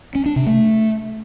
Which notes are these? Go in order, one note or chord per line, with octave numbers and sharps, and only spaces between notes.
C#4
D4
C3
A3